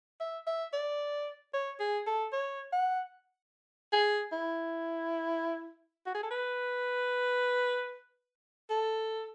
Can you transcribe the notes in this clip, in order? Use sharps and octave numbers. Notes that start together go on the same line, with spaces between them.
E5
E5
D5
C#5
G#4
A4
C#5
F#5
G#4
E4
F#4
G#4
A4
B4
A4